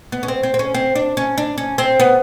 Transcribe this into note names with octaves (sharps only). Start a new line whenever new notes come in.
B3
C#4
C4
C4
C4
C#4
C4
D4
C#4
D4
C#4
C4
B3